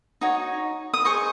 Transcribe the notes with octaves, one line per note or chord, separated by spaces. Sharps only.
D#4 F#4 C#5
D#6
G#4 C5 D#5 C#6